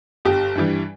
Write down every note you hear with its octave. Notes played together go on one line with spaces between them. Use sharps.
G1 G4
G2 E3 G3